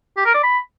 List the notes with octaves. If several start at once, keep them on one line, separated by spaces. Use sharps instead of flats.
G4
A#4
D5
B5